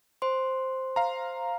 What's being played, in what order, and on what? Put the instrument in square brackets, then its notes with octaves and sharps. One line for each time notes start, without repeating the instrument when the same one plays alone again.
[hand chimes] C5 C6
[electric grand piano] F5 A#5